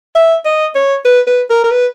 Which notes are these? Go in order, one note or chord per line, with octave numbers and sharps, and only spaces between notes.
E5
D#5
C#5
B4
B4
A#4
A#4
B4